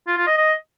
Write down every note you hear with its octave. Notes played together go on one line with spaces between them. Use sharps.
F4
F4
D#5
D#5